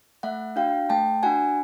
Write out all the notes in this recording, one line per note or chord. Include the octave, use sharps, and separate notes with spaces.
A3 E5 F#5
D4 F#4 F5 G5
A3 G5 A5
D4 F#4 F#5 G#5